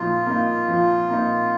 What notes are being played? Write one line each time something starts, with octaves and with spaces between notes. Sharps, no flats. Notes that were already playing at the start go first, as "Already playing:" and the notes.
Already playing: F3 A#3 D#4 F4
A#3 D#4
F3
A#3 D#4